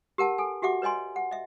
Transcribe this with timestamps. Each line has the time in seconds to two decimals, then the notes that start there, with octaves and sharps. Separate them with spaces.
0.18 G4 A#4 F#5 A5
0.38 A4 G#5
0.62 F#4 G4 E5 F#5 D6
0.82 B4 C#5 D#5 G#5 C6
1.16 F#5
1.31 D#5 E5